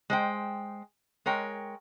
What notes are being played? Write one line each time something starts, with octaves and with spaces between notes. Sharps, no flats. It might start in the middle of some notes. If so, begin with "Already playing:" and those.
G#3 C5 G5
G#3 A#4 C#5 G5